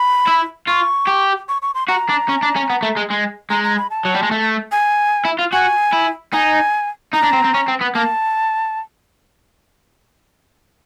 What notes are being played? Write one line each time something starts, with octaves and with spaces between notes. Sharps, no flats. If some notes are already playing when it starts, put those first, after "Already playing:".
Already playing: B5
E4
F4 C#6
G4
C#6
C#6
C6
F#4 A#5
D4
C#4
D4
C#4
B3
A3
G#3
G#3
G#3 A#5
A#5
B5
A5
F#3
G3
G#3
A3
G#5
E4
F4
F#4 G#5
E4
D#4 G#5
D#4 A#5
D4
C4
C4
C#4
C4
B3
A#3 A5